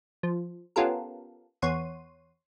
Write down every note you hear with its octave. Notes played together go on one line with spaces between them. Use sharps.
F3
B3 C#4 F4 G4 A4 A#4
E2 C#5 F#5 C6 D#7